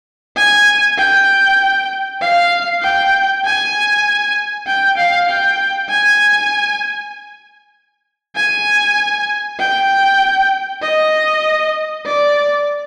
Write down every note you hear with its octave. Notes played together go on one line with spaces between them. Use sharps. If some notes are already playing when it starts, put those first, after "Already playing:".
G#5
G5
F5
G5
G#5
G5
F5
G5
G#5
G#5
G5
D#5
D5